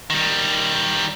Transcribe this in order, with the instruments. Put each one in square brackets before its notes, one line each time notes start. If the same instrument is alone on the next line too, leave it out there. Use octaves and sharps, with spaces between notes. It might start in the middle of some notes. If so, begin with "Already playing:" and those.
[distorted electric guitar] D#3 G3